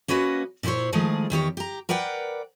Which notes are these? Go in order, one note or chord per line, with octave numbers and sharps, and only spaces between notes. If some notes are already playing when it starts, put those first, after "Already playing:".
A#3 C#4 F#4 B4 D#5
A#2 E4 F#4 C5 C#5
D#3 F3 G#3 A3 G#4
E2 D#3 G4 C#5
G4 A#5
A#4 B4 D5 F#5 G5